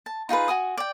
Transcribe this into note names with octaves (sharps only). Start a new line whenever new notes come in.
A5
D#4 F4 G#4 B4
F#4 G#5 D#6
D5 G5